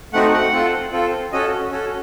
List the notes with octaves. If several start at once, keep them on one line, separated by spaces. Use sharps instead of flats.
A3 C4 D#4 F#4 F#5
F#5
C4 F4 A4
C4 F4 A4
C#4 F#4 A4 D#5
C#4 F#4 A4